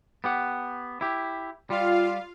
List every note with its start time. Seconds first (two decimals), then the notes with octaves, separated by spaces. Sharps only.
0.24 B3 G4 F#5
1.01 E4 G4
1.70 G3 F4 F5